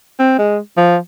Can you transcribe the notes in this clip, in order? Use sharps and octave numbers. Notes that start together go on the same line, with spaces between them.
C4
G#3
F3